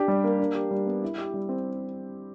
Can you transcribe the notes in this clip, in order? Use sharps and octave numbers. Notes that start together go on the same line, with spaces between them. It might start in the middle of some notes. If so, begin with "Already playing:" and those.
Already playing: D4 G4
G3
A#3
D4
G4
G3
B3
E4
G4
G3
C4